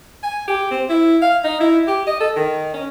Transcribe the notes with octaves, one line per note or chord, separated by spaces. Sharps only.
G#5
G4
C4
E4
F5
D#4
E4
G4
D#5
A4
D#3
C#4